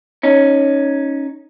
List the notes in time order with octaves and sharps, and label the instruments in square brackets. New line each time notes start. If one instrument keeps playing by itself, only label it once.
[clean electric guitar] C#4 D#4